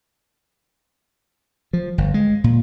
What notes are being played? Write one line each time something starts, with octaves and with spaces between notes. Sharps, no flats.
F3
G1
G#3
A#2